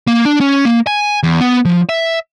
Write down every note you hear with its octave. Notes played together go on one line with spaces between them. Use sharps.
A#3
D4
C#4
A#3
G#5
E2
B3
F3
E5